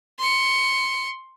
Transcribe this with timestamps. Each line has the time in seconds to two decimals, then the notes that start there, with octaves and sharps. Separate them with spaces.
0.19 C6 C#7